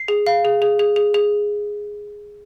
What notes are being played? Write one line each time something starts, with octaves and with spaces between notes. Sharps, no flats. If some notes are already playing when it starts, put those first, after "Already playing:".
Already playing: C7
G#4
F5
G#4
G#4
G#4
G#4
G#4